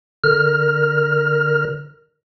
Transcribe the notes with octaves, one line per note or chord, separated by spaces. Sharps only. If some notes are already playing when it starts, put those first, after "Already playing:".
D3 A#4 F6